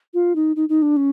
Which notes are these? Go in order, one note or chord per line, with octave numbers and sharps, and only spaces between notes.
F4
D#4
D#4
D#4
D4
C#4